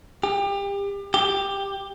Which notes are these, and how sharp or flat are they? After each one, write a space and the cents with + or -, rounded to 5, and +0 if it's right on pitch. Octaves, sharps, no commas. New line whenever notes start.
G4 +30
G4 +10